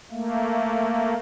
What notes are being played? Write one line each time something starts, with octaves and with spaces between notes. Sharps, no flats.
A3 A#3